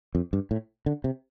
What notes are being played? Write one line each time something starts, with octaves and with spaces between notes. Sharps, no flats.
F2
G2
A2
D3
C3